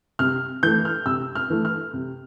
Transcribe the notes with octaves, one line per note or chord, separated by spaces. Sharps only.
C3 F6
E3 A3 G6
F6
C3 E6
F6
E3 A3
F6
C3